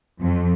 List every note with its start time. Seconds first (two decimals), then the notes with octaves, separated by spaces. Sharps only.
0.21 F2